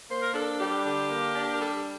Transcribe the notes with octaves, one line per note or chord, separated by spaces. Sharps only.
A#3 C5
A#4
D4 A4
G3 G4
D3
A#3
D4
A#4
G3 A4